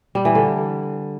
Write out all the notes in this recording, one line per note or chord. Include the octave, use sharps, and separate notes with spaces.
G3
E3
D3